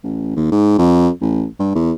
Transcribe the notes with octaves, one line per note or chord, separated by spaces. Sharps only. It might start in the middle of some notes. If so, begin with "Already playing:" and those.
A1
D#2
G#2
F2
A1
G2
E2